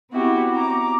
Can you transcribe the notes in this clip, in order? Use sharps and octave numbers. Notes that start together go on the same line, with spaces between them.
B3 C4 E4 F#4 G4
A#5 D6